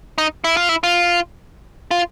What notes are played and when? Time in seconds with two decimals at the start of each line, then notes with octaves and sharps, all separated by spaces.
0.18 D#4
0.44 E4
0.57 F4
0.69 E4
0.83 F4
1.91 F4